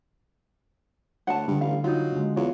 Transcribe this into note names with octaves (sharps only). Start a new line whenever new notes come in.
D2 C#5 F#5 A5
G2 D3 G3
A1 F5
F#3 D#4 F4
D3 G#3
E2 F4 F#4 C#5